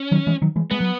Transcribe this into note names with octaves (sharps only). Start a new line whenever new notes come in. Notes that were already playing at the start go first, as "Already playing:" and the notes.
Already playing: C#4
D#3 F#3
E3 G#3
D#3 F#3
E3 G#3
G#3 B3
F#3